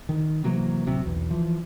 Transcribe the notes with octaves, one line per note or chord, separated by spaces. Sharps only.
D#3
C3 E3 F#3 A#3
D1 C3 F#3
B1 E2
E3 F3